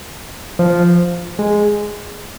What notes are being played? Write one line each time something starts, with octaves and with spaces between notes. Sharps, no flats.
F3
G#3